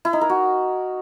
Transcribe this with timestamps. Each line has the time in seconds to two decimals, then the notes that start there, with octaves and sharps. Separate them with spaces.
0.05 E4
0.13 D#4
0.21 A#4
0.30 F#4